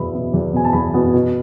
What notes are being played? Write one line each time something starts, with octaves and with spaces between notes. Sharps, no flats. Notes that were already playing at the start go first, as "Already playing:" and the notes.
Already playing: E2 B2 B3 E5 B5
B2 B3
E2
B2 B3 G#5
A5
E2 B5
B2 B3
B2